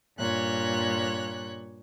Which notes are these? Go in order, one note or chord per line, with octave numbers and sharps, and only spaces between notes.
G2 A#2 C#5 F#6